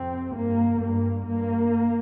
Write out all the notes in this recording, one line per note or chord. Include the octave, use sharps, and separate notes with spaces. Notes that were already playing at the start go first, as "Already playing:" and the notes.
Already playing: F2 C3 C4
G2 A#3
G2 A#3
G2 A#3